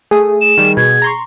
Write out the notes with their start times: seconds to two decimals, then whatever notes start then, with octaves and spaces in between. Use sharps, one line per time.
0.11 A3 G#4 D#6
0.41 E7
0.57 D#3 G3
0.77 B2 G#6
1.02 A#5 C6 C#6